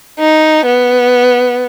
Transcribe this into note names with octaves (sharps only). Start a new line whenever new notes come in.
D#4
B3